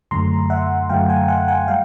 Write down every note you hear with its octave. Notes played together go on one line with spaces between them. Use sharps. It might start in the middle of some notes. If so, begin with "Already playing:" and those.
F#2 D3 F#3 A3 A#5 C6
E5 F#5
F#2 D3 F#3 A3 F5 G5
F#5 G#5
F#5 G#5
F#5 G#5
G3 F5 G5